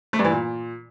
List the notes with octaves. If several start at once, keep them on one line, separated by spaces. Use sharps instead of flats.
A3
G2
E3
A#2